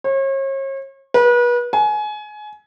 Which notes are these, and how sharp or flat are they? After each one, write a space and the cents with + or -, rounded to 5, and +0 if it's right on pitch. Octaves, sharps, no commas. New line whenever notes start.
C#5 -40
B4 -35
G#5 +25